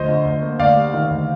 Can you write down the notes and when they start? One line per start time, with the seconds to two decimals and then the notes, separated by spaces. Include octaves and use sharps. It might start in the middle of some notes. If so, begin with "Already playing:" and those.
Already playing: D2 F3 C5 D#5
0.08 D3
0.25 D2
0.42 A#3
0.59 D2 D5 F5
0.76 G3
0.94 D#3
1.10 D2